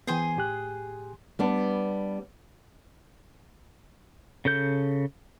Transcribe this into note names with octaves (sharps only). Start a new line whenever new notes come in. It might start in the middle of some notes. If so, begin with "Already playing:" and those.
E3 B3 G#4 C5 G#5
A2 G4 F#6
G3 B3 D4
C#3 A4 G6